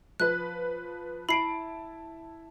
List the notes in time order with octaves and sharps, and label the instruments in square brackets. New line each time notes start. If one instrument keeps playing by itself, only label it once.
[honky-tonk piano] F3 B4 [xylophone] F#6
[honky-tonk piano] E4 A5 D7 [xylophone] B5 C7